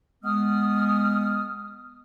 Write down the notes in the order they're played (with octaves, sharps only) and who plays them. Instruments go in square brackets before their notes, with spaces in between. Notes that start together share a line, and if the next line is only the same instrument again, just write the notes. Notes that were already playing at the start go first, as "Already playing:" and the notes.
[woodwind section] G#3 B3 D#6 F6